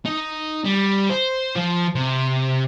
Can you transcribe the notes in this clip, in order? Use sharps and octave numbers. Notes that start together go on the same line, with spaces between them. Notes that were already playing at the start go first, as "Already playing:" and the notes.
D#4
G3
C5
F3
C3